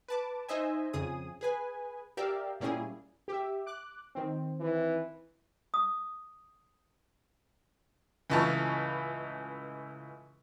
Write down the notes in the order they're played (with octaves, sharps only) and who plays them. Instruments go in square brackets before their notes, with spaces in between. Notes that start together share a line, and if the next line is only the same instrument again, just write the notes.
[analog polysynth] B4 A5 D6
D#4 C5 D#5 E5 G#5
F2 C#3 G#4 D#6
G#4 B4 G#5
G4 A#4 D5 E5 F5
A#2 G3 A#3 C#4 E4 G#4
[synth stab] G4 E5
D6 F#6
D#3 C4
[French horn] E3
[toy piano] D#6
[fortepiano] C#2 A2 E3 F4 A5 C#6